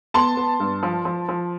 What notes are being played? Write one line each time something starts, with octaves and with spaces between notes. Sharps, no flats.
B3 A5 C6
B3
G2
F3
F3
F3